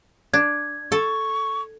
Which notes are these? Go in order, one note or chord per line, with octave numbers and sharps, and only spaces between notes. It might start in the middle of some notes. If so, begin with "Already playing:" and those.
D4 G#6
A4 C#6